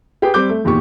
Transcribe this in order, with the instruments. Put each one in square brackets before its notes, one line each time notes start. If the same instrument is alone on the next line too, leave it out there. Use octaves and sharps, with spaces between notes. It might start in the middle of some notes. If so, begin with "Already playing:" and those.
[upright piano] G4 G#4 B4 G5
G3 C4 D6 G6
A3
E2 A#2 D#3 G4 C#6